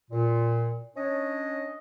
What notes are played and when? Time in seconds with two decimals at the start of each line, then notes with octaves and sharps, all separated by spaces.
0.11 A#2
0.96 C#4 D4 C#5 D#5